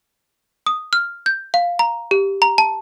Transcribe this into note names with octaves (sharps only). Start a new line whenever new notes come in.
D#6
F6
G6
F5
A#5
G4
A#5
A5